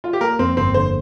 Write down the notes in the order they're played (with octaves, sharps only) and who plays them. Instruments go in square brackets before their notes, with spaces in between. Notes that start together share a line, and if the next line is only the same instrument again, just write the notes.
[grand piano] F4
G4
[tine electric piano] A#3 [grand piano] A#4
[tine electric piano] F2 [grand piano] C4
[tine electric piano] G1 [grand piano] C4
[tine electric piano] D3 [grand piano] C5